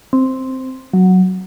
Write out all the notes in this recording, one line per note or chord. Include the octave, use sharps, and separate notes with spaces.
C4
F#3